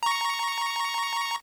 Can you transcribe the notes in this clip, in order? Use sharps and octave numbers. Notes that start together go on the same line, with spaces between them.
A#5 C#6